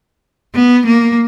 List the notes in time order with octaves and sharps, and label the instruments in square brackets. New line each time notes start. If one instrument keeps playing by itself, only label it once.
[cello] B3
A#3